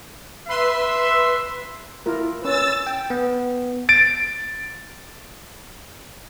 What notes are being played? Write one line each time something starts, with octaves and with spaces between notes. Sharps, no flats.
B4 E5 C6 E6
E4 F4 A#4
C#4 B4 E6 A6
G5
B3
A6 D7